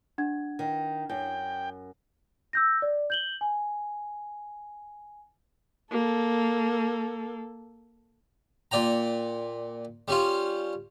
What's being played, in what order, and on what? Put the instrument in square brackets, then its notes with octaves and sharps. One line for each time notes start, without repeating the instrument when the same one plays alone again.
[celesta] D4 F#5 G#6
[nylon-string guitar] D#3
[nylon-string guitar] F#2 [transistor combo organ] G5
[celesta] E6 G6 A#6
D5
G6 F#7 G7
G#5
[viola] A#3 A4
[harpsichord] A#2 D5 G5 A#5
G3 C#4 F4